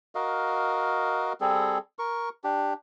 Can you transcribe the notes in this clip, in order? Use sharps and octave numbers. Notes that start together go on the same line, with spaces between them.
F#4 A#4 D#5 F5
G3 C4 G#4 A4
A#4 C#6
D4 G4